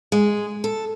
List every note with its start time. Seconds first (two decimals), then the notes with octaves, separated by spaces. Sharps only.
0.12 G#3
0.64 A4